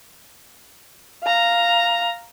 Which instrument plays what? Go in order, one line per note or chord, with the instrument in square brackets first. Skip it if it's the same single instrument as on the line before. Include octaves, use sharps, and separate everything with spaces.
[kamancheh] F5 A#5